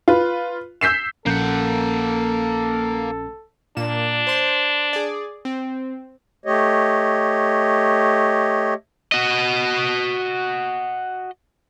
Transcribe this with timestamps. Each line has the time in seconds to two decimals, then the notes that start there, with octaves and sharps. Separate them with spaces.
0.08 F4 B4
0.81 E6 G6 B6 C7 E7
1.26 A#1 A#3 C#4 A4 F#5 G6
3.77 A#2 D4 E7
4.27 C5 C6
4.93 G#4 D5
5.45 C4
6.46 A3 G4 C#5 D#5
9.12 F#4 D#5